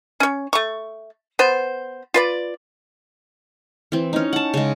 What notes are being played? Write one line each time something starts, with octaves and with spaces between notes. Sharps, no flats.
C#4 C#5
A3 C#6
B3 C5
F4 B4 D5
E3 C4
C#4 D#4
F#5 A5
C#3 G#3